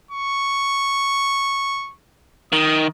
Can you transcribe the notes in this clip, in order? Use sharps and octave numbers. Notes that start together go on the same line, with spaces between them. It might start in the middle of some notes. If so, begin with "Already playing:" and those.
C#6
D#3 D#6